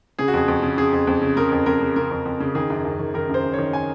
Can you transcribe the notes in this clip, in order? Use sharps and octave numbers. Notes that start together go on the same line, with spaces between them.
C#3 G#4
F#4
F2 G#4
F2
C#3
C#3 G#4
F2
F2
C#3
C#3 A#4
F2
F2 A#4
C#3
C#3 A#4
F2
F2
C#3
D#3 G#4
F#2
F#2
D#3
D#3 A#4
F#2 C5
F#2
C#5
D#3
D#3 G#5